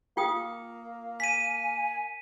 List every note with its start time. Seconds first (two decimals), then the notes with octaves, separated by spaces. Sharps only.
0.17 A#3 F4 G5 D#6
1.20 G#5 B6 D#7